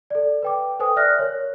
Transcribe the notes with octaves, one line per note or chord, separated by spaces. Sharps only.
A4 D5
B4 G5 D6
A4 B4 C5 G5 G#5 D#6
D5 E5 F6 F#6 A#6
A#4 C#5